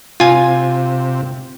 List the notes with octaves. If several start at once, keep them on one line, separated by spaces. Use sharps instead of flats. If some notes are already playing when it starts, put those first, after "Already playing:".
C3 F4 G#5